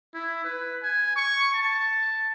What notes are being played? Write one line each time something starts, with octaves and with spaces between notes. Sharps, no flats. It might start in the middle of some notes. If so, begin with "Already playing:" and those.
E4
B4
G#5
C#6
A5